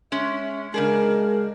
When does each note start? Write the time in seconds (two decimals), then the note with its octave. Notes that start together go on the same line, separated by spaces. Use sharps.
0.12 G#3 C#4 E5
0.74 C#3 G#3 D4 G#4 A#4